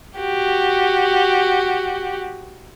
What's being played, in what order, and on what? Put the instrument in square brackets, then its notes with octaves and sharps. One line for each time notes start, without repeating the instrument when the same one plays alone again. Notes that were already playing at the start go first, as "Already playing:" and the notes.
[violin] F#4 G4